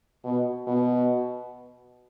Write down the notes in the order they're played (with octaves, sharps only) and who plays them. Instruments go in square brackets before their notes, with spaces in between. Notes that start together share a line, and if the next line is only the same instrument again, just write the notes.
[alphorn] B2
B2